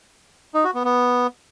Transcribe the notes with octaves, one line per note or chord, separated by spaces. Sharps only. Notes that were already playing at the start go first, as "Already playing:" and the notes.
D#4
F#4
B3
B3